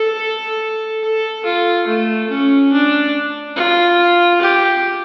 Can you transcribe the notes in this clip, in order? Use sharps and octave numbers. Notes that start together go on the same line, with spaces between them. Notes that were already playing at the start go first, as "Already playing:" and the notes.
Already playing: A4
A4
F4
A3
C#4
D4
F4
G4